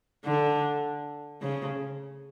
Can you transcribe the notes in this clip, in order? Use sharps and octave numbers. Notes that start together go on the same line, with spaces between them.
D3
C#3